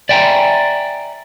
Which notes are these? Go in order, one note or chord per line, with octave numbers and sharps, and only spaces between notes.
D5 E5 G5 G#5 A#5